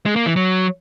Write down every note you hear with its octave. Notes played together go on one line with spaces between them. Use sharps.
G#3
A#3
E3
F#3